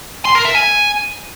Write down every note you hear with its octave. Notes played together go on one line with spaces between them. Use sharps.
C6
A#4
E5
G#5